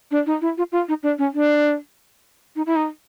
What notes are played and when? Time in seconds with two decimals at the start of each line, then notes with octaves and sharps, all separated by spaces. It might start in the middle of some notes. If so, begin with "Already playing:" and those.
0.11 D4
0.26 D#4
0.41 E4
0.58 F4
0.72 F4
0.88 D#4
1.03 D4
1.18 C#4
1.34 D4
2.56 D#4
2.66 E4
2.76 D#4